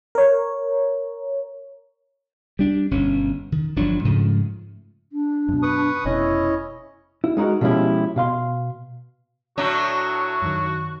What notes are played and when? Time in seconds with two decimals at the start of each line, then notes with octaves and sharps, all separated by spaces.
0.15 A#4 C#5
2.59 G3 D4
2.91 G1 B2 C#4
3.52 D#3
3.76 G1 F3 F#3 D4
4.05 G#2 C#3 F3 A3
5.12 D4
5.48 F#2 B2
5.62 B4 C#6 D#6
6.05 F1 B2 C#4 E4 C#5 D#5
7.24 E4
7.37 G#3 D#4 E4 F#4 A#4
7.61 B2 F3 G#3 C#4 E4 G4
8.16 B2 F5 C6
9.58 A2 F#3 D4 F#4
10.42 F#2 D#3